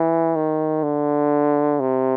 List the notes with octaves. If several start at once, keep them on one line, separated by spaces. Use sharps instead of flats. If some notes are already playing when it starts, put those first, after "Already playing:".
Already playing: E3
D#3
D3
C3